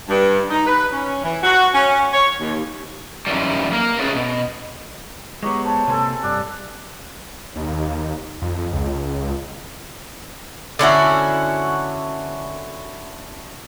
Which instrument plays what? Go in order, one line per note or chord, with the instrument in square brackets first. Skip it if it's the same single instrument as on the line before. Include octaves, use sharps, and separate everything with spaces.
[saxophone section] G2
D#4
B4
C#4
E3
F#4
C#4
C#5
D#2
[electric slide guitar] F#2 D#3 E3 G3
A#3 A#4
A3 C#4 G#4 B4
B2
[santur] F#3 G4 D#5 [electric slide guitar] G#3 B3 [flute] C#6
[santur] C5 C#5 [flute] A5
[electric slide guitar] C3 A#3 [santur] A4 G#5 C6
[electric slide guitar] G2 [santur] G4 D5 [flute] F#6
[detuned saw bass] D#2
F2
C#2
[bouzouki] D3 C#4 E4 F#4